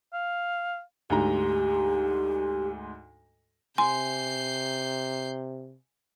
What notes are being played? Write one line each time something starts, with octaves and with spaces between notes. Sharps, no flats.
F5
D2 G#2 G4 A#5
C3 G#5 C6 G6 C7